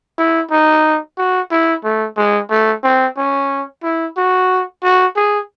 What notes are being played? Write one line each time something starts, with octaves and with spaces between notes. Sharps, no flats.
E4
D#4
F#4
E4
A3
G#3
A3
C4
C#4
E4
F#4
F#4
G#4